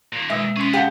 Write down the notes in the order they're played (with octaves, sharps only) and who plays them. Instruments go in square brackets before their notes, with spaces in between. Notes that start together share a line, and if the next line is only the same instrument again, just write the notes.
[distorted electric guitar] A#2 D#3
[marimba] B2 G#3 [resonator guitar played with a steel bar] E5
[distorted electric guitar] B3 G#4 [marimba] C#4 C6
[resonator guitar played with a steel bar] G4 [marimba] F5 F#5 A5